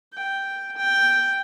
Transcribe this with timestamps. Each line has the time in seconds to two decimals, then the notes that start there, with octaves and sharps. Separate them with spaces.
0.14 G5
0.77 G5